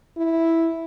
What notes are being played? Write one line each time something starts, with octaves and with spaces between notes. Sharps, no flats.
E4